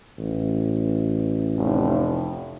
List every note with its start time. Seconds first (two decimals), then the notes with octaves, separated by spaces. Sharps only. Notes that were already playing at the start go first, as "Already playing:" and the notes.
0.18 A1
1.57 F1